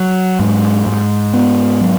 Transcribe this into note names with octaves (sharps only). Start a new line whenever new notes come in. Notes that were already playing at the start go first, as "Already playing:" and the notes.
Already playing: F#3
G#2
G#2
B3
F#3